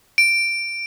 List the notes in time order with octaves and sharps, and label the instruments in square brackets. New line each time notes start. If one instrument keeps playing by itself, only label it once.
[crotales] D7